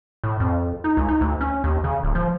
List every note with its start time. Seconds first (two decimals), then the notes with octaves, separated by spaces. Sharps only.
0.24 A2
0.40 F2
0.84 D#4
0.97 C#2
1.09 D#4
1.21 D2
1.41 C#4
1.64 D#2
1.84 C#3
2.03 D1
2.15 F3